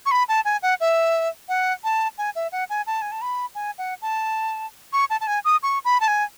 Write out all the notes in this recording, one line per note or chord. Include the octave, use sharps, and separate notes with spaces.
C#6
B5
A5
G#5
F#5
E5
F#5
A5
G#5
E5
F#5
G#5
A5
G#5
A5
B5
G#5
F#5
A5
C#6
A5
A5
G#5
D#6
C#6
B5
A5
G#5